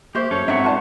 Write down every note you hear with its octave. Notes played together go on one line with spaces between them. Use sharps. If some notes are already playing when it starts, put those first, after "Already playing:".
A#3 F#4 G4 C5 E5
F#2 C#4 A4 C#5
G#1 C4 D4 D#4 E5 F#5
F4 F#4 B4 D5 A5